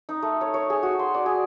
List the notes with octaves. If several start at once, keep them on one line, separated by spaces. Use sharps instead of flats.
D#4
A3
C#5
C#5
G#4
F#4
C6
D5
G#4